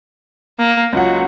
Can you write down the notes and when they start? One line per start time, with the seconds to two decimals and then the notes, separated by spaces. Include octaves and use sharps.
0.59 A#3
0.93 C#2 F#3 F4 F#5